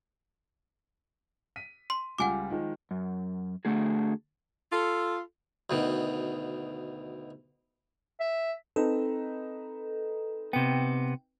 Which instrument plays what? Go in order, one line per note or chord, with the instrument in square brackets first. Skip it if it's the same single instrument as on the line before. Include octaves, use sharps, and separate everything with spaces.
[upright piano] B6 D#7
[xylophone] C6
[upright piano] C#2 G3 F4 [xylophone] F#5 G#5 D6
[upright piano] D#3 F3 G#3
[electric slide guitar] F#2
D3 A3 F#4 G#4
[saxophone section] F4 A4
[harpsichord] D2 B2 D#3
[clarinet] E5
[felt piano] C4 D#4 B4 [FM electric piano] A4
[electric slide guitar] C3 B3 [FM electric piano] G5